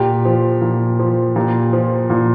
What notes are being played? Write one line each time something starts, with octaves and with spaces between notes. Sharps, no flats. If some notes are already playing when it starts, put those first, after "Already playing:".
Already playing: A#2 G4
F3
A#2
F3
A#2 G4
F3
A#2